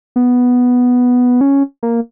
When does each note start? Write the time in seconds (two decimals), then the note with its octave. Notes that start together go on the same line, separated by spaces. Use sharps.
0.16 B3
1.41 C#4
1.83 A#3